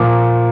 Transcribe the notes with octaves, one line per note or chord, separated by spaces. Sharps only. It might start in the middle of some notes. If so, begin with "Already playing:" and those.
Already playing: A#2 F3 A#3